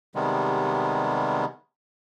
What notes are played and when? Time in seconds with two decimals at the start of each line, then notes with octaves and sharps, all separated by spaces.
0.15 C3 D#3 G3 G#3 B3